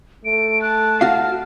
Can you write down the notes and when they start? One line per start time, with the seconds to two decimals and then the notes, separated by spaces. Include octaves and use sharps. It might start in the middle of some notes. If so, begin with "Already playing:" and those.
0.25 A3 D7
0.61 A5 F#6
1.01 F#4 F5 F6